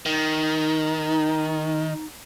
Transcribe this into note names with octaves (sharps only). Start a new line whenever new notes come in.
D#3 D#4